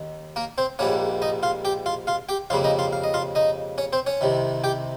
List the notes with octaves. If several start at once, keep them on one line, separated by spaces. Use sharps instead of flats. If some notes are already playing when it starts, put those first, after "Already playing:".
Already playing: D#2 D#3
A#3 A#4
C4 C5
A#1 G#2 G3 A#3 C#4 C#5
D#4 D#5
F4 F5
G4 G5
F4 F5
F4 F5
G4 G5
F2 C#3 G3 A#3 F4 F5
D#4 D#5
F4 F5
F5
D#5
F4 F5
D#4 D#5
C#4 C#5
C4 C5
C#4 C#5
C2 C3 D#3
G4 G5